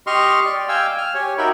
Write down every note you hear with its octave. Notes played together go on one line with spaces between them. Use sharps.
G4 D#5 C6 C#6 F6
D5
F5 G5 G#5 E6
F6
G4 C#5 G#5
D#4 F#4 A#4 E5 G5 B5